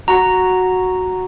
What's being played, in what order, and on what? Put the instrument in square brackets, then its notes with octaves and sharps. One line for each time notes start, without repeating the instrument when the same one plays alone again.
[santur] F#4 [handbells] A#5